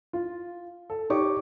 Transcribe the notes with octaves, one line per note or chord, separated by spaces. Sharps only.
F4
A4
D#4 G4 C#5 C#6 D6